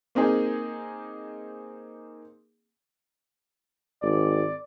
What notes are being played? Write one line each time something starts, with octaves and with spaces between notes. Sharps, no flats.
A#3 C4 D#4 G#4
G#1 D5